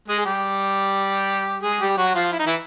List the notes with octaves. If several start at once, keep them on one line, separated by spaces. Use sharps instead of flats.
G#3 G#4
G#4
G3 G4
G#3 G#4
G3 G4
F#3 F#4
F3 F4
E4
D#4
E3 E4